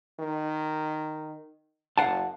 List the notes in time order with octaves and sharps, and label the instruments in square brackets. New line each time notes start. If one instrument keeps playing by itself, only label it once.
[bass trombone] D#3
[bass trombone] F#1 [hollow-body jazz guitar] F5 F#5 A5